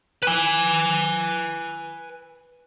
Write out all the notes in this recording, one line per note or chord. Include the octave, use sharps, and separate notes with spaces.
B4 G#5